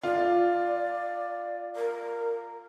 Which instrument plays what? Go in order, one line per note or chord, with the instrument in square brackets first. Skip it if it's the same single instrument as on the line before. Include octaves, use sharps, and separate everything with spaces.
[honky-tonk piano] F4 [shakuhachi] D5
[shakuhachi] A#4